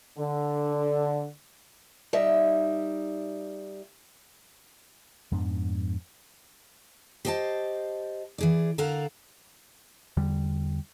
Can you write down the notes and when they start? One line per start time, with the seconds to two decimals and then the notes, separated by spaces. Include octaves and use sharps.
0.18 D3
2.13 G3 D#4 E5
5.32 F2 G#2 B3 D4
7.25 G4 C5 D#5 G5 A5
8.38 E3 G#4 D5
8.78 D3 A4 A#4 F5 F#5
10.17 E2 D3 G3